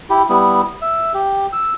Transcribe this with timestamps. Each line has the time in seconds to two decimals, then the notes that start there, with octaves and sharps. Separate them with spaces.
0.10 E4 G4
0.30 G3 B3 E4
0.82 E5
1.14 G4
1.53 E6